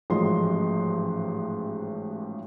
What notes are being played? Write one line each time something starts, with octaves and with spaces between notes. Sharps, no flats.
A1 G#2 F3 F#3 D#5 C6